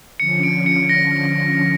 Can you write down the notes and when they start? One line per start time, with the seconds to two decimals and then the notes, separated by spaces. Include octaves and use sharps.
0.20 D3 F3 C#4 C#7
0.43 D7
0.66 C#7
0.89 A#6